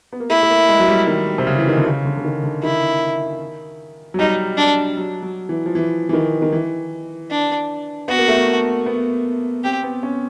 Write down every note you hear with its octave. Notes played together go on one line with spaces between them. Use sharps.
B3
A#3
A3 E4
A3
A#3
G#3
F#3
G3
D#3
C3
C#3
E3
D#3
D3
C#3
D3
D3
D#3
D3
D#3 E4
F#3
G3 D#4
D4
F#3
F#3
E3
F3
E3
E3
D#3
D#3
E3
D4
B3 F#4
A#3
A3
A#3
B3
C4 G4
B3
C#4